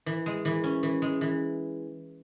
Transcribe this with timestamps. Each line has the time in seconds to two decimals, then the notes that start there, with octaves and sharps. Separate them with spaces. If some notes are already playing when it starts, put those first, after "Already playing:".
0.06 E3
0.26 G#3
0.45 E3
0.64 C#4
0.83 E3
1.02 G#3
1.21 E3